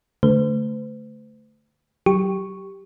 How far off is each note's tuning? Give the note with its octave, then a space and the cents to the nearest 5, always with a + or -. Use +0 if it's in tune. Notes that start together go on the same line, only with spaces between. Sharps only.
D3 -25 A3 +0 C5 -45
F#3 +30 G4 +0 C#6 +0